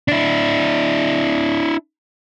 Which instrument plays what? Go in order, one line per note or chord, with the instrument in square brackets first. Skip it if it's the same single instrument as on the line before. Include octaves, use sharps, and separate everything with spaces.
[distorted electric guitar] D4 E4